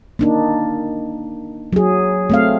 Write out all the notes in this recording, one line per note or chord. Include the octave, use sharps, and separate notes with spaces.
A#3 D4 D#4
F#3 G#4
A3 C4 F5